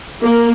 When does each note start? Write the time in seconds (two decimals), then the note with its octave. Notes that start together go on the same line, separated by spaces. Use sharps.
0.22 A#3